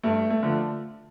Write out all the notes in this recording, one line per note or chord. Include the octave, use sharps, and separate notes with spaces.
G2 A3
A3
D3 F3